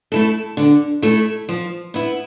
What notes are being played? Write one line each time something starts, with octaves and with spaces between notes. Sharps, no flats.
A3 E4 A4
D3
A3 E4 A4
F3
B3 E4